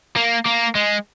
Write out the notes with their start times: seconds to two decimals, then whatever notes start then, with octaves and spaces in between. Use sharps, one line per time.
0.16 A#3
0.46 A#3
0.75 G#3